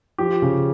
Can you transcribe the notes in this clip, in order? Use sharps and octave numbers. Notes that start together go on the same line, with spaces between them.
F3 G4
C#3